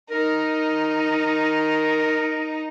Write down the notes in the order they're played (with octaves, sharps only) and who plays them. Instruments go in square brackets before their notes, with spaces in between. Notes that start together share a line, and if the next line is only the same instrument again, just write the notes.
[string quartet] D#4 [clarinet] A#4